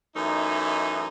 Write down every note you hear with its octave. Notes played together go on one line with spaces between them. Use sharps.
F#2 E3 A3 D#4